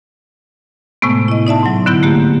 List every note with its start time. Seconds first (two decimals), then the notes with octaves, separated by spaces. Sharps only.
1.02 A2 C3 G#3 A3 B3
1.28 E4 D#5
1.47 D#4 D5 E5 A5
1.63 G#2 F#3
1.86 G#2 D3 B3 E4 G6
2.03 A3 A#3 G4